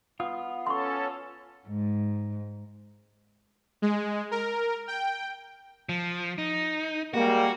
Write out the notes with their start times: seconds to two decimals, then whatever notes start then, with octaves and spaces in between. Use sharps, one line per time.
0.20 B3 F4 D#6
0.67 C#4 A4 C6 C#6
1.67 G#2
3.82 G#3
4.31 A#4
4.88 G5
5.89 F3
6.38 D#4
7.14 G3 G#3 A#3 F#4